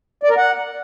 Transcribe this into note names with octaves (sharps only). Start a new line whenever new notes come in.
D5
A#4
F#5